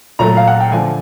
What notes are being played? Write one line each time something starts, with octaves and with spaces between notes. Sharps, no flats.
A#2 F#3 A3 A#5
F5
F#5
G5
D3 F3 A3 G#5